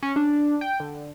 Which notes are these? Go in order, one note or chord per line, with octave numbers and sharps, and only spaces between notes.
C#4
D4
G5
D3